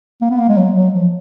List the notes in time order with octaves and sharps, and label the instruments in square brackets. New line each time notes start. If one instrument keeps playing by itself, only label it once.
[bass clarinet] A#3
B3
A#3
G#3
F#3
F#3
F3